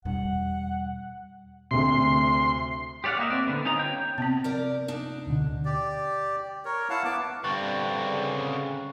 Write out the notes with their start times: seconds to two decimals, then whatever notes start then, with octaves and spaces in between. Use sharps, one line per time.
0.05 E2 B2 G3 D4 F#5
1.71 D2 C3 C6
3.04 G4 C#5 D5 F5 F#5
3.18 A#3 D#5 E5
3.30 C4 D5
3.47 D3 B3
3.65 C#4 D#4 F4 D#5 A#5
3.79 C#5 G5 G6
4.18 C3 B3 C4
4.44 A#4 D5
4.88 D4 D#4
5.27 D2 B2 D3
5.65 G4 D5
6.65 A#4 C#5
6.90 E4 F5 F#5 A5
7.05 B3 A5 D6
7.44 G2 D3 C4 C#6 F#6 A6
8.04 C#3